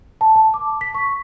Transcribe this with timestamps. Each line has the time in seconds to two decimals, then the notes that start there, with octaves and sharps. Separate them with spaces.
0.21 A5
0.36 A5
0.54 D6
0.81 B6
0.95 C#6